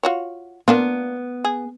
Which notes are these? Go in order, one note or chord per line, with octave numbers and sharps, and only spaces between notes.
F4 F#4 C#5
A#3 B3 D4 F4
G#4